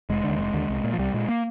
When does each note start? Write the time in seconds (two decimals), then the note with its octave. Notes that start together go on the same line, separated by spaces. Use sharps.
0.09 F1 G#3
0.24 D3
0.29 D#2
0.39 F1
0.54 D#2 D3
0.69 C2
0.84 A#2
0.93 F3
0.98 C2 G3
1.14 A#2 G#3
1.28 A#3